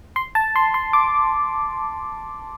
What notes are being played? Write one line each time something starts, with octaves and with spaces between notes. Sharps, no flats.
C6
A5
C6
C6
D6